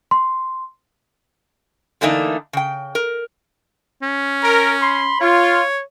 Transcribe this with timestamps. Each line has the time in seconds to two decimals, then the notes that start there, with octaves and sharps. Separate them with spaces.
0.11 C6
2.01 D3 E3 A3 A#3 D4 D#4
2.53 C#3 G5
2.95 A#4
4.03 C#4
4.43 A#4
4.81 B5 C6
5.21 F4 C#5